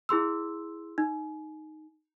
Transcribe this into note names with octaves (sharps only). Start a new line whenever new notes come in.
E4 G#4 C6 E6
D#4